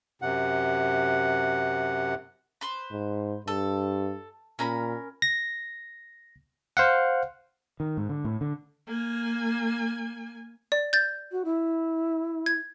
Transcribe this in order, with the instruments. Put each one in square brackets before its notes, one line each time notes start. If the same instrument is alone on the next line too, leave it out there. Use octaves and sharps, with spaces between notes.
[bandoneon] F#2 C3 F#5
[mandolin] B4 C5
[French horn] G#2
[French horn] G2 [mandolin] A4
[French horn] A#2 [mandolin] C#4 A#4 B5
[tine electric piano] A#6
C5 F5 F#5
[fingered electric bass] D#3
G#2
D3
A2
D3
[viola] A#3 G#5
[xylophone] D5
G6 A6
[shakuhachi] F#4
E4
[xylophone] G#6